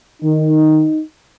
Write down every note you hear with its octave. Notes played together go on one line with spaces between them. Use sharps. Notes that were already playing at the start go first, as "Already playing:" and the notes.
D#3 D#4